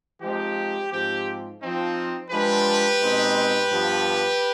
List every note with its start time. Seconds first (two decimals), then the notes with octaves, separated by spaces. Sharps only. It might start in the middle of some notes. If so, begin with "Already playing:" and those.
0.21 F3 G#3 C4 D#4 G4
0.91 G#2 F3 C4 G4
1.62 F3 C4 D#4
2.30 F3 G#3 D4 G4 B4
3.00 B2 G#3 C4 D#4
3.70 G2 F3 B3